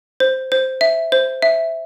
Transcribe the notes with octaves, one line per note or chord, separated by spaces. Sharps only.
C5
C5
E5
C5
E5